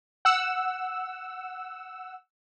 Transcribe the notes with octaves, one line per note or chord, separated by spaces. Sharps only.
F#5 E6